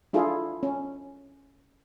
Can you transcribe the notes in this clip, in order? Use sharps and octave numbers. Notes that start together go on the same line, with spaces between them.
D4 E4 F4 G#4 A4
C#4